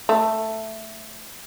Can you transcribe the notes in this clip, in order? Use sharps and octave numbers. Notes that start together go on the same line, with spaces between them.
A3